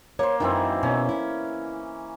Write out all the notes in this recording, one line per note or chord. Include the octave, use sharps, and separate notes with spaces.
A#3 C5 C#5
F#2 D#3 E3 F#3 C4 D4
B2 C#4
E4